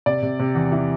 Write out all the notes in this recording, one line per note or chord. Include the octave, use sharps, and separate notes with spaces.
C3 D5
C3
C3
E2
E3